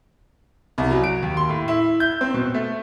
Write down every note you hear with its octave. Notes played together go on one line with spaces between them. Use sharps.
C2
F#3
D7
D#2
C6
A2
E4
G6
C4
B2
A3